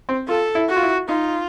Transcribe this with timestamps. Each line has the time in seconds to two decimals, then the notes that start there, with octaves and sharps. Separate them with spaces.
0.09 C4
0.28 F4 A4
0.55 E4
0.69 F#4
0.77 F4
0.83 E4
1.09 D#4 F4